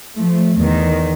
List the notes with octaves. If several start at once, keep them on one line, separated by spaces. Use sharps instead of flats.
F3 A3
E2 D#3